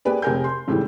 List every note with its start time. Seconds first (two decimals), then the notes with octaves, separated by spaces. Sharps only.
0.05 A#3 G4 G#4 B4 D5
0.22 F1 G4 G#4 A#4 G#5 G6
0.44 C6
0.68 G#1 A2 C#3 E3 G4